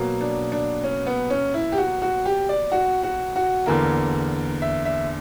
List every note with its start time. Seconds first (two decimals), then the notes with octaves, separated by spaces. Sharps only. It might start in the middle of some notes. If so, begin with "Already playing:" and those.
Already playing: B2 F#3 A#3
0.21 D4
0.52 D4
0.84 C#4
1.07 B3
1.30 C#4
1.54 E4
1.72 G4
1.77 F#4
2.02 F#4
2.25 G4
2.49 D5
2.72 F#4
3.03 F#4
3.36 F#4
3.66 E2 D3 A#3 A#4
4.62 E5
4.85 E5